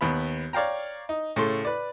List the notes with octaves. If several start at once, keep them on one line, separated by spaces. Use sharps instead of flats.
D#2 B3 B5
C#5 D5 F5 G5 A#5
D#4
A2 C#3 A4 C6
B4 D5